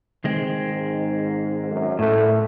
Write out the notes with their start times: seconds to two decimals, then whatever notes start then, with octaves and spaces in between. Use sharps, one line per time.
0.24 D#3 G#3 C4
0.65 G#2
1.70 F#2
1.99 A2 A3